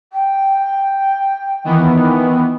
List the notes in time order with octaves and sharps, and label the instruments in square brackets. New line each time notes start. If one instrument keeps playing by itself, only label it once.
[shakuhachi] G5
[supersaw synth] D#3 E3 B3